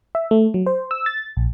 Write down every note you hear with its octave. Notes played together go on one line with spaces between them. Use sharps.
E5
A3
F#3
C5
E6
A6
A#1